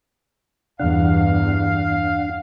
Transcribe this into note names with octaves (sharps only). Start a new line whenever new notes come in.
E2 G2 D4 F5 F#5